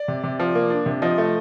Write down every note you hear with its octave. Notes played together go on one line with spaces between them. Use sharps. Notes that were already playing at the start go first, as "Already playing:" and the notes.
Already playing: D5
C3
C3
F3
A#3
D4
C3
F3 D#5
A3